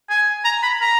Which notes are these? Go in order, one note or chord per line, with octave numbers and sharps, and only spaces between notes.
G#5
A#5
B5
A#5